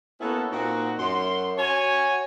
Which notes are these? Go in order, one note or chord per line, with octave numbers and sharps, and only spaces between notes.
A#3 B3 C#4 E4 F#4 A4
A#2 A#3 C4 D#4 F#4
F#2 C6
F#4 C#5 G#5